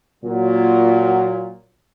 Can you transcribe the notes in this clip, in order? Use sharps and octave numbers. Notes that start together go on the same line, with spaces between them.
A#2 F#3